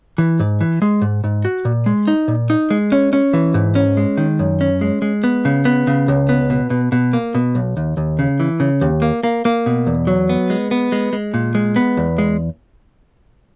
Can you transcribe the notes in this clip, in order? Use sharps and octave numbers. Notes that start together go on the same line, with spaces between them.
E3
G#2
E3
G#3
G#2
G#2
F#4
A#2
G#3
D#4
A#2
D#4
G#3
C#4
C#4
E3
G#2
C#4
G#3
D#3
F#2
C#4
G#3
G#3
B3
C#3
B3
C#3
C#2
B3
B2
B2
B2
A#3
B2
B1
D#2
D#2
C#3
E3
C#3
D#2
A#3
A#3
A#3
B2
E2
F#3
B3
G#3
B3
G#3
G#3
A#2
G#3
B3
E2
G#3